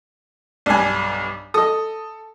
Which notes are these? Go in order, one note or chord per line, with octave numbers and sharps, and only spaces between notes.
B1 G2 D4 G#5
A4 D#5 D#6